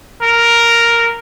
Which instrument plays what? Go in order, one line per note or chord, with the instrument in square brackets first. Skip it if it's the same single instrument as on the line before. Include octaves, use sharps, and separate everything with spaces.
[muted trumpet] A#4